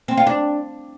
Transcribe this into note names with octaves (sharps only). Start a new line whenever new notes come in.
C4
F4
D4